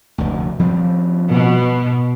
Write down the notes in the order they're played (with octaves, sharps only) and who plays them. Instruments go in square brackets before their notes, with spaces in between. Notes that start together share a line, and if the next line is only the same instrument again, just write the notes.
[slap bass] F1 D2
F3 G3 C4
[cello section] B2